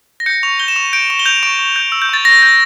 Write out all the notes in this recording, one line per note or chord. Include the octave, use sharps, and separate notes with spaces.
A#6
G6 C#7
C#6 F7
G6 G7
E7
C#6 F7
G6 D7
C#6 E7
G7
G6 F7
C#6 D7
C#6
G6
E6
G6
C#6 A6
C#6 A#6
G6